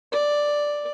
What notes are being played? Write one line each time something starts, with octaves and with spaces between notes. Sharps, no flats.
D5